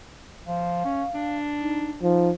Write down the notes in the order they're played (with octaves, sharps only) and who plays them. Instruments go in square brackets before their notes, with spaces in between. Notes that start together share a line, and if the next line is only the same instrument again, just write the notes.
[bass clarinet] F3 [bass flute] F5
[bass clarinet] C#4
D4
[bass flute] D#4
[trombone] F3 [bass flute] D#4